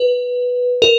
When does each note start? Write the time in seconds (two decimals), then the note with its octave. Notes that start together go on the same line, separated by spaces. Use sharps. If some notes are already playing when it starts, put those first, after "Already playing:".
Already playing: B4
0.82 A#4